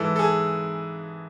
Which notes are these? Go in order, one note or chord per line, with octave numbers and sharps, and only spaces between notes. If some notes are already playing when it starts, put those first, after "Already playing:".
Already playing: G#2 E3 A4
A4
G#4